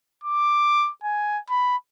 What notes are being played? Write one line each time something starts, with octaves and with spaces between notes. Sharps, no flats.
D6
G#5
B5